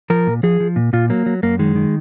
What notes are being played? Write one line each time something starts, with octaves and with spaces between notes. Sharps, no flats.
F3 A#4
A#2
F3 G#4
F3
A#2
A#2 F4
F#3 A#3
F#3
F#2 A#3
D#3 G#3
D#3